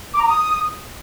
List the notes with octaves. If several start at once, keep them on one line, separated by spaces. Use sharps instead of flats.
D6
A#5
D#6